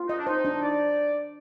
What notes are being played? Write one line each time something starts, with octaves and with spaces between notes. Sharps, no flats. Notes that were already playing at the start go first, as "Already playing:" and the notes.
Already playing: F4
D#4 D#5
D4
D#4 C5
D4
D5